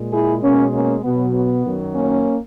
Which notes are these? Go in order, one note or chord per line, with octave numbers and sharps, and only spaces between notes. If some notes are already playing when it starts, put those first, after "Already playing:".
Already playing: A#2 G#3
E4 G#4
B2 G#3 A#3 C#4
A#3 C#4
B2 F#3 B3
B3
F#2 D#3 F#3
A#3 C#4